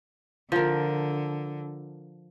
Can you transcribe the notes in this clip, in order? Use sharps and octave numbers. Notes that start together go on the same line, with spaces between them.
D3 F3 A#4